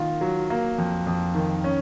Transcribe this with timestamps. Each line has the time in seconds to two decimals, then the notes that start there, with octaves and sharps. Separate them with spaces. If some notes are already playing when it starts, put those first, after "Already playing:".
Already playing: D#3 A#3 F4
0.21 F#3
0.50 A#3
0.78 F2
1.07 F2
1.35 D#3
1.64 C#4